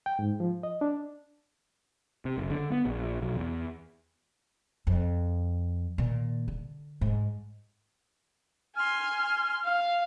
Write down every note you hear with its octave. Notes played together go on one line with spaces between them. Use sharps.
G5
G#2
F3
D#5
D4
C3
F#1
D3
B3
A#1
B1
E2
F2
A#2 D#3
D3
G#2
G#5 C6 F6
F5